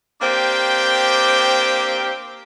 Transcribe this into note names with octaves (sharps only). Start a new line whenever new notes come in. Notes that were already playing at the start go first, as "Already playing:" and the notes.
A#3 C4 D4 G4 G5